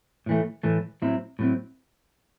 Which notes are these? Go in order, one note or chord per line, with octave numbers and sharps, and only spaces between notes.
A2 E3 A3
A2 E3 A3
A2 F#3 C4 E4
A2 F#3 C4 E4